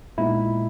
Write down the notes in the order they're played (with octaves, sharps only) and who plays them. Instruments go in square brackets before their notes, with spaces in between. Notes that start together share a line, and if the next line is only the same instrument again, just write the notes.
[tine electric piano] A#2 G#3 B3 D#4 E4